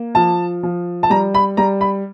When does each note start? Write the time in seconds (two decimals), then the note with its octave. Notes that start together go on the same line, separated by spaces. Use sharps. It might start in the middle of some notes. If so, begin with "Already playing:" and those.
Already playing: A#3
0.15 F3 A5
0.63 F3
1.03 A5
1.10 G3 A#5
1.35 B5
1.57 G3 A#5
1.81 B5